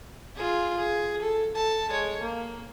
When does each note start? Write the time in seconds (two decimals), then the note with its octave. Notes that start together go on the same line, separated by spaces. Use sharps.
0.35 F4 G#4
0.76 G#4
1.22 A4
1.55 A4 A5
1.90 G#3 C#5
2.21 A#3